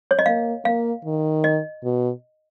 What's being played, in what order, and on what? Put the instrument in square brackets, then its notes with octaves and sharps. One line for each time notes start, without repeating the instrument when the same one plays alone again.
[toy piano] C#5
D#5
[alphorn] A#3 [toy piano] F5
[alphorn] A#3 [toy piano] F5
[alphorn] D#3
[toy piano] D#5
[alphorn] B2